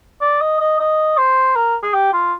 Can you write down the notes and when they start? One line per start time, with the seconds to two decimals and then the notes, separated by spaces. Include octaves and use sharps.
0.21 D5
0.41 D#5
0.60 D#5
0.80 D#5
1.18 C5
1.56 A#4
1.83 G#4
1.94 G4
2.13 F4